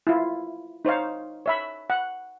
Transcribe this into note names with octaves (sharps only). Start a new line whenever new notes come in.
E4 F4
D#4 C5 C#5 F5
C#5 E5 B5
F#5